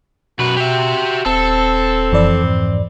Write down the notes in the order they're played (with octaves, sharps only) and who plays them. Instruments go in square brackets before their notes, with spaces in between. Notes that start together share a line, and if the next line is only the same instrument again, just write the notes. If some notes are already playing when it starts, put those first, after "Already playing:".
[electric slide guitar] F#2 B4 [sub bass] B2 [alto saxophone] F#4
[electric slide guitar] G4 E5
[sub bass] D#1 [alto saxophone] C4 [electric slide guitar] A4
[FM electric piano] F2 E3 D5
[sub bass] G#2